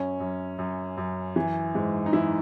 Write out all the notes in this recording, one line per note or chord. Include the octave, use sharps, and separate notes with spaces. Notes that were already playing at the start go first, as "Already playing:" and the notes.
Already playing: F#2 C#4
F#2
F#2
F#2
E3
G#2
D#4
E3 E4